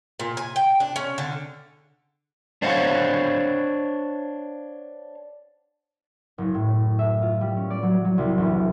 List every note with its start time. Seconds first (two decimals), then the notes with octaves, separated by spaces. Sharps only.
0.20 A#2
0.37 G#5
0.56 G5
0.80 D4
0.96 C#4
1.18 D3
2.62 D4 C5 C#5 F5 F#5
6.38 F#1
6.55 A2
6.99 E5
7.22 F4
7.41 G3
7.57 C#4
7.70 D5
7.83 F#3
8.05 F#3
8.18 C2
8.38 E1